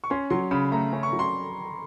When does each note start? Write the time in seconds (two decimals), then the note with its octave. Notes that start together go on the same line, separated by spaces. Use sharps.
0.04 C#6
0.10 C#4 C6
0.30 F#3 C6
0.51 C#3 B5
0.72 A3 A#5
0.93 C#4
1.03 C#6
1.13 F#3
1.19 C6